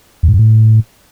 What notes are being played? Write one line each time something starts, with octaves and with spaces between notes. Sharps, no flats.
E2
G#2
F#2
A2